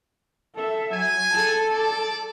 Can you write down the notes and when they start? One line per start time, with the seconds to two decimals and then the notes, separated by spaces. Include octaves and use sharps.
0.55 A4 E5
0.93 F#3 G#5
1.31 A4 A5
1.71 D5